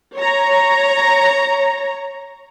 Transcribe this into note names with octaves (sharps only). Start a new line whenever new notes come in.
C#5 A#5